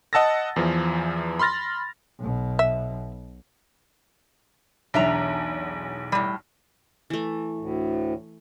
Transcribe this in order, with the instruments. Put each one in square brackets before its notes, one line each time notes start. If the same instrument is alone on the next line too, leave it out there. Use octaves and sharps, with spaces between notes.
[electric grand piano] D#5 F#5 A5 E6 A6 A#6
E2 E3 F3
B5 C6 F6 A6 A#6
[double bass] B1 B2
[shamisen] E5
[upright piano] B1 E2 [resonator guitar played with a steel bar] D4 E5 A#5
[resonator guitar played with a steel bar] A2 G3
[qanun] E3 A3
[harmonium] D2 A2